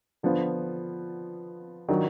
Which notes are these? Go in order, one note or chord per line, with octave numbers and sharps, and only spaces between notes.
D3 F3 B3 F4
D#3 F#3 D4 F4